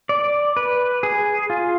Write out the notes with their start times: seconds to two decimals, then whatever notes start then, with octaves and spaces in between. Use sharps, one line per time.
0.09 D5
0.57 B4
1.03 G#4
1.50 F4